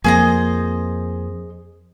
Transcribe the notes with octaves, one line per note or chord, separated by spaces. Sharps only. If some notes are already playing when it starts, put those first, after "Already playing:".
F2 A#3 G#4 C5 D#5